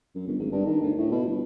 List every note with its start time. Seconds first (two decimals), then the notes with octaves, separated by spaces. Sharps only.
0.15 F#2
0.27 G1
0.39 G#1
0.52 G2
0.66 D#3
0.82 D2
0.98 A2
1.12 B2
1.26 G1